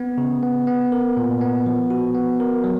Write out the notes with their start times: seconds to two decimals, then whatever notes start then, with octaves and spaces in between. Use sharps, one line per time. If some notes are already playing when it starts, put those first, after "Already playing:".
Already playing: B3
0.18 C#3
0.43 B3
0.67 B3
0.92 A#4
1.17 A#2
1.41 B3
1.66 F3
1.90 F#4
2.15 B3
2.40 A#4
2.64 F#3